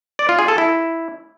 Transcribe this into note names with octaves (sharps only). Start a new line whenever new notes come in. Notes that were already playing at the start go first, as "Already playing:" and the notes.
D5
F4
G#4
A4
E4